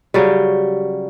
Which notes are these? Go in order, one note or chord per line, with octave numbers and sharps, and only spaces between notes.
C#3 F#3 G3